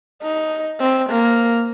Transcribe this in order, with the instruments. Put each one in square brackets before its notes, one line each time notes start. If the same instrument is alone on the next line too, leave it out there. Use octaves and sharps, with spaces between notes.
[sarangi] D#4
C4
A#3